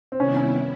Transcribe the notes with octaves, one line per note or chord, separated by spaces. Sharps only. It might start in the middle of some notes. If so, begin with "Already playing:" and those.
C4
C3 D#3 G3 B3 C#4 E4
C#4